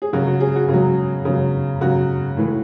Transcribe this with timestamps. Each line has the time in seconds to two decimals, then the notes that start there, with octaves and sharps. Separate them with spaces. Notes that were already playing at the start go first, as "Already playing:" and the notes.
0.02 G#4
0.13 C#3 F#3 F#4
0.27 F#4
0.40 G#4
0.55 F#4
0.68 C#3
0.73 F#3
1.25 C#3 F#3
1.81 C#3 F#3 F#4
2.37 A2 E3